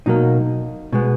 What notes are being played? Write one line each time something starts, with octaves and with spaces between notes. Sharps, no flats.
B2 F#3 A#3 D#4
B2 G#3 B3